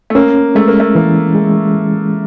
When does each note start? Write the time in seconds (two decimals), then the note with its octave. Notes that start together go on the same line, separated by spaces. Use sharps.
0.10 A3
0.15 A#3 C#4
0.55 G#3 A3
0.68 A#3
0.80 A3
0.95 E3 A#3
1.35 G#3